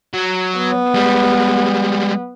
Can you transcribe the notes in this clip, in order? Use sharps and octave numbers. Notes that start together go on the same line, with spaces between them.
F#3
B3
G3 G#3